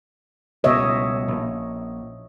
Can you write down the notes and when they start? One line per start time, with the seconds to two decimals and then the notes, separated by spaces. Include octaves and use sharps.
0.64 C#2 B2 C#5 D#5 E5
1.28 A#1